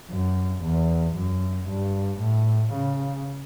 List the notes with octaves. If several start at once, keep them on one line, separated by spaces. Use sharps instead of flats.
F#2
E2
F#2
G2
A2
C#3